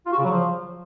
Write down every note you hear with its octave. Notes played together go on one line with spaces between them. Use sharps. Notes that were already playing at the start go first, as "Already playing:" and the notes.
F4
F#4
C#3
F#3
F3